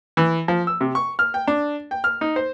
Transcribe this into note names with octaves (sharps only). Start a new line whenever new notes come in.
E3
F3
E6
C3
C#6
F6
G5
D4
G5
F6
D#4
C5